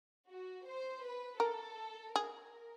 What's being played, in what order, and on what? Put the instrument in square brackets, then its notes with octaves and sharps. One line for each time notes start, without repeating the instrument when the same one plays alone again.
[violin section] F#4
C5
B4
[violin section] A4 [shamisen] A#4
[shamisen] G#4 [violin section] A#4